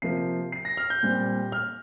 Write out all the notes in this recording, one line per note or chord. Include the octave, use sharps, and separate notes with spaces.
C3 F3 A#3 C7
C7
A#6
F6
G6
A#2 G3 C4
F6